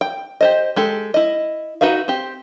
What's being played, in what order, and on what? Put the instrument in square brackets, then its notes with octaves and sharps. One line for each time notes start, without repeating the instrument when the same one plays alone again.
[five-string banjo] G5
G4 C5 D#5
G#3 G4 A4
E4 D#5
D#4 F#4 B4 E5 F5
C4 G4